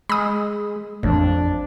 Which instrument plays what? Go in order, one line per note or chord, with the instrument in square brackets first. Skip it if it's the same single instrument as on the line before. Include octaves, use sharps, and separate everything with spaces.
[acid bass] G#3 [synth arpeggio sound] B5 D#6
[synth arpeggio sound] A1 [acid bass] F2 [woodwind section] D4